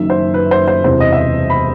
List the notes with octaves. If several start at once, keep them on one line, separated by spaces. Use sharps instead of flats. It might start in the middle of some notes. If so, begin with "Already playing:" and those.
Already playing: F#1 F#2 D#3 E5
C5
B4
C5
C5
E1 E2 C3 E3 C5
D#5
E5
D#5
B5